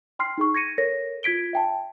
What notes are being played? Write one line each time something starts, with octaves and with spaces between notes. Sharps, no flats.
G5 C6 F6 C7
D#4 G#4 C#6
G#6 A#6 C#7 D#7
A4 A#4 C#5 A#6
F4 G#6 B6 D7 G7
E5 G5 A5